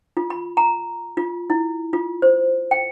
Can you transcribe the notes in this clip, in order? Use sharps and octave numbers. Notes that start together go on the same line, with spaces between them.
F4
B5
A#5
F4
E4
F4
C5
G5